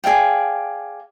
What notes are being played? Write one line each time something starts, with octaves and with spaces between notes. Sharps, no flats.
G#4 D5 F5 G5